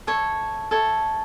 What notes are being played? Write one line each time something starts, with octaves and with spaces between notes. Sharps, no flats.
A4 C#5 E5
A4 C#5 E5